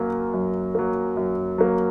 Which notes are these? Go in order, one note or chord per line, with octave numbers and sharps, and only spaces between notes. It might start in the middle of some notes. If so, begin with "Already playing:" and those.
Already playing: F#2 F#3 A#3
F#2
F#3 A#3
F#2
F#3 A#3